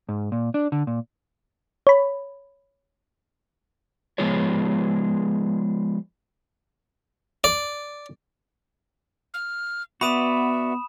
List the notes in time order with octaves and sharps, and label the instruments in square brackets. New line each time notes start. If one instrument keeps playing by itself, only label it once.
[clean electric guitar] G#2
A#2
D4
D3
A#2
[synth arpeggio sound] C#5 B5
[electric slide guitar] F3 G#3 B3 F4 G#4 C#5
[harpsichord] D5
[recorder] F6
[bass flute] B3 [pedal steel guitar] F#4 B4 D5 [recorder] E5 [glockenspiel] B5 D#6 E7